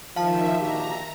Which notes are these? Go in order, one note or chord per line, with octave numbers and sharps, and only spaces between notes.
D#3 F3 E5 F5 A5
A#1 F#4 G4 A#5